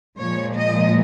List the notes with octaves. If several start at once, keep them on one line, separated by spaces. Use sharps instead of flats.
A#2 F3 G#3 C#5
D#5